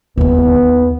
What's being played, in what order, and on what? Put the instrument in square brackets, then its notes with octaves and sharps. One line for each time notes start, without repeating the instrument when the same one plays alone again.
[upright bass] D#2 D#4 [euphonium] B3